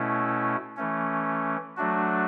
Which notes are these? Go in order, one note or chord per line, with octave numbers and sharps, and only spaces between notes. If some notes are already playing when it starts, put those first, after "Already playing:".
Already playing: B2 A3 C#4 E4
E3 A3 C#4
F#3 A3 D4 F#4